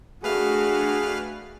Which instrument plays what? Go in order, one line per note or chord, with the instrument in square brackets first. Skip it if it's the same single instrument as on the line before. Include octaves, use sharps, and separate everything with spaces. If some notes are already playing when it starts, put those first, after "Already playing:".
[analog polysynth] A3 D4 [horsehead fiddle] F#4 [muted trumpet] G#4 [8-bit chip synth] B4 F5 F6